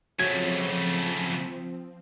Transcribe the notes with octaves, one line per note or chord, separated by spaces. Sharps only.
C#3 F3 F#3 A3 C4 G#6